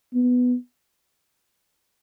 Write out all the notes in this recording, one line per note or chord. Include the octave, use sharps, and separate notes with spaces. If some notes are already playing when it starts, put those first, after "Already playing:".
B3